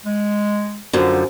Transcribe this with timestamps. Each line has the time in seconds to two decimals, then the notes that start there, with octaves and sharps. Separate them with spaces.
0.05 G#3
0.93 F#2 D3 F3